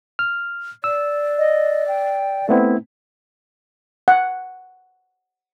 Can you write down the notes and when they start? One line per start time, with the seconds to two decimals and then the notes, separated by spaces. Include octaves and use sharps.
0.19 F6
0.84 D5 E6
1.38 D#5
1.88 G5
2.49 A3 B3 C4 E4
4.08 F#5